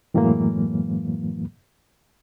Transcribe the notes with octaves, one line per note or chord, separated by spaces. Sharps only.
F#2 A2 E3 F#3 G#3 A#3